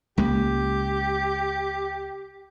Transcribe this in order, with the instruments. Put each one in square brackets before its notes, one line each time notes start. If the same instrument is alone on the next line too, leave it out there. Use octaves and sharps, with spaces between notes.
[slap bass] C#2 G#3 A#3 [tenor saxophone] G4